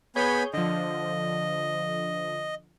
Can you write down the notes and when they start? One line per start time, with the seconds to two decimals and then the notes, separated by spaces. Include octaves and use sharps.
0.16 B3 G#4 C#5 G#5 B5 G6
0.53 D3 F3 D#5